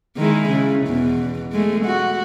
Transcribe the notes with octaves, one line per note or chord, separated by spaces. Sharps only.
D#3 G#3 E4
C#3
E2 B2
G#3 A3
F#4